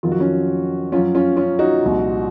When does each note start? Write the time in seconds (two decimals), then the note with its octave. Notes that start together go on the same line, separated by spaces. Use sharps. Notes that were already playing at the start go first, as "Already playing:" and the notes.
0.03 F2 D#3 F#3 F4
0.12 F#4
0.20 C#4 F4
0.92 F#2 C#4 F4
0.95 F3
1.15 C#4 F4
1.37 C#4 F4
1.59 D#4 F#4
1.82 C2 A#2 F3